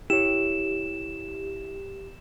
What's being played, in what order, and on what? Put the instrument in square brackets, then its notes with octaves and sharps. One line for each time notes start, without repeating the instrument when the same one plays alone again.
[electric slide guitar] E4 C#5 [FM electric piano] G4 [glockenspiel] E7